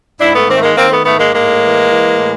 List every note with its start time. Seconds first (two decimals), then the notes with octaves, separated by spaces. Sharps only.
0.20 G#2 D4 E4
0.34 A3 B3
0.48 D#3 A#3 C4
0.56 A3
0.63 G#3 A#3
0.76 D#3 A#3 C4
0.90 A3 B3
1.04 G#2 A3 B3
1.18 G#3 A#3
1.33 A2 G#3 A#3
1.62 E3
1.90 E3
2.18 A2